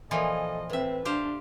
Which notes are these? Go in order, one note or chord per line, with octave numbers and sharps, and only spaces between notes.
A#2 E3 F3 A4 D#5
A2 C4 B4 E5
D4 G4 C5 F5